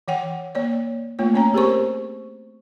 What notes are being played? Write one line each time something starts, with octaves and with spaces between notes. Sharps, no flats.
E3 C#5 F#5 G5
A#3 C#5 D5
A3 A#3 F4 C#5
C4 C#4 C#5 G5 A#5
C4 G4 G#4 A#4 C5 C#6